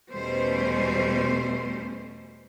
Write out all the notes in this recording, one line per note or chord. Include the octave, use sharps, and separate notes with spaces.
E2 B2 G3 A3 C#4 C5